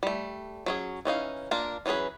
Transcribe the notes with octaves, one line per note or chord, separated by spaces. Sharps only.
G3 A3
F#3 C#4 G#4
E3 C#4 D#4 F5
A#3 D4 F4 A#4
E3 F#3 C#4 G#4 B4